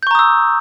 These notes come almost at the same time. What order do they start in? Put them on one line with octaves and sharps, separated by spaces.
G6 C#6 A#5 D#6 E6